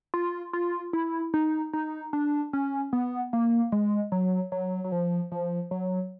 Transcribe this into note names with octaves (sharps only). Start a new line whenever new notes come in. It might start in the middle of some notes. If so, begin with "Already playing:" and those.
F4
F4
E4
D#4
D#4
D4
C#4
B3
A#3
G#3
F#3
F#3
F#3
F3
F3
F#3